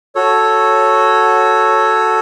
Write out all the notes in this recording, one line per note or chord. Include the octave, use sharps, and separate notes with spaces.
F#4 A4 C#5